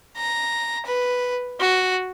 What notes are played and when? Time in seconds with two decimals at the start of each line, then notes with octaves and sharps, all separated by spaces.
0.17 A#5
0.86 B4
1.60 F#4